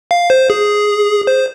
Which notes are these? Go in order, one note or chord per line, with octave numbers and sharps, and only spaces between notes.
F5
C5
G#4
C5